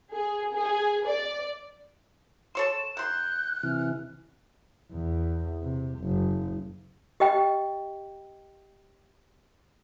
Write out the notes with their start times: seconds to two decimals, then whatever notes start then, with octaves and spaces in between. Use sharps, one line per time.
0.13 G#4
0.54 G#4
1.06 D5
2.55 A4 C#5 C6 E7
2.97 D#3 C6 F#6 G6
3.63 C3 E3 F6
4.92 E2
5.62 C3
6.00 F#1
7.20 G4 D#5 G5